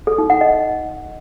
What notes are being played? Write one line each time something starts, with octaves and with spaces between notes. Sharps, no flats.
A4
D#4
F#5
D#5